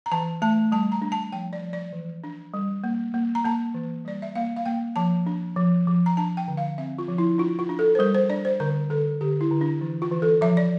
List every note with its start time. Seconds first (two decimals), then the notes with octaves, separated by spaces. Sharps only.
0.06 A#5
0.12 E3 A5
0.42 A3 A5
0.72 G3 A5
0.92 A#5
1.02 D4
1.12 A5
1.32 F3 G5
1.53 D5
1.62 F3
1.73 D5
1.93 E3
2.24 D4
2.54 G3
2.84 A#3
3.14 A#3
3.35 A#5
3.44 A#3 A5
3.74 E3
4.05 G3 D5
4.22 E5
4.35 A#3 F5
4.56 F5
4.65 A#3 G5
4.96 F3 A5
5.26 D4
5.56 F3
5.87 F3
6.06 A#5
6.17 D4 A5
6.37 G5
6.48 D3
6.57 F5
6.78 C4 E5
6.98 F4
7.08 F3
7.18 E4
7.38 D4 F4
7.59 F4
7.69 D4
7.79 A4
7.95 C5
7.99 G3 A#4
8.15 C5
8.30 D4 D5
8.45 C5
8.60 D3 A#4
8.90 D3 A4
9.21 D3 G4
9.41 E4
9.51 D3
9.61 D4
9.81 E3
10.02 F4
10.12 E3
10.22 A4
10.41 F3 E5
10.57 D5